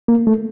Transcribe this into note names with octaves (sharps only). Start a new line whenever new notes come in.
A#3
A3